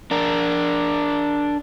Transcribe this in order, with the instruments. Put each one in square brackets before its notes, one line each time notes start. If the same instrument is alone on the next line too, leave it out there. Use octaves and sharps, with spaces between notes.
[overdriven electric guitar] D4 A#4